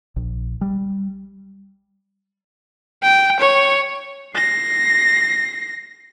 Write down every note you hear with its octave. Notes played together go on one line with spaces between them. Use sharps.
A#1
G3
G5
C#5
A#6 C7